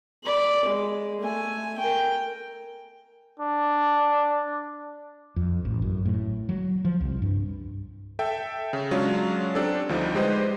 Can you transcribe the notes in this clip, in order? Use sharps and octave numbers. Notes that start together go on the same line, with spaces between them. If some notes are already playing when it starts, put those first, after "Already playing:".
D5 B5
G#3
A3 G#5
A#4 G5
D4
F2
A1
F#2
A2
F#3
F3
C2
G2
A4 E5 G5
C#3
F#3 G#3 C#4 D4 F4
C4 D4 G4 A4
D2 F3 G3 D#4
G#3 G4 B4 C5 D#5